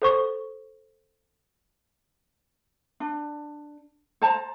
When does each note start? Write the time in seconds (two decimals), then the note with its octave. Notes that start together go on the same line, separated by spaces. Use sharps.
0.02 A4 C5 C#6
3.00 D4
4.22 C5 A5 A#5